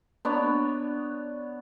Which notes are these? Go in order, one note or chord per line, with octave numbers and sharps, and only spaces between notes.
B3 D4 C#5